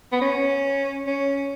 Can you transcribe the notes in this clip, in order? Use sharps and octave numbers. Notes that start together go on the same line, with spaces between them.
B3
C#4
C#4